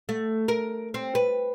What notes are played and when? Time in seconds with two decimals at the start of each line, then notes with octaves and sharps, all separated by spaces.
0.09 A3
0.48 A#4
0.94 C4
1.15 B4